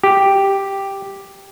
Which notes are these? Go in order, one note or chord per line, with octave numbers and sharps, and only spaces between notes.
G4